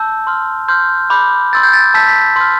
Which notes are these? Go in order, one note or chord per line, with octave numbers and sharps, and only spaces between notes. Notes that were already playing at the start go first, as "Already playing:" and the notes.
Already playing: A5 E6 G6
C6 F6
C6 F6 G6
B5 D6 G6
C6 E6 G6 A6
G6
A6
A6
A5 E6 G6 B6
A6
B6
C6 F6